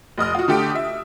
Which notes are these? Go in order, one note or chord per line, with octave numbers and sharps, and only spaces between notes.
F1 D#5 D#6 F6
F4 F#4
D3 A3 G4 G5 D7
E5